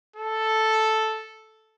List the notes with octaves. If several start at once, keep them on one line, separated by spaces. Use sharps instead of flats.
A4